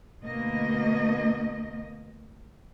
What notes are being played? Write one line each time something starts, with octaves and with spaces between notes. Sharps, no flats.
D2 B2 A#3 D#5